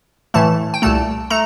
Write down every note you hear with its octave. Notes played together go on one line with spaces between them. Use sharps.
A2 E3 A3 A5
G5
C2 A#2 A3 A5
A3 A#5